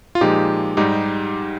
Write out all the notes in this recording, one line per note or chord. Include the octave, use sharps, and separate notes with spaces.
F4
A#2 F3 G#3 D#4 G4
G#2 G3 D#4 G4